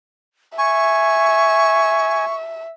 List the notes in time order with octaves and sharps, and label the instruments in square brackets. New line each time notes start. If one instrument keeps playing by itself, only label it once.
[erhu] E5 [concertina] G#5 [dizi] C#6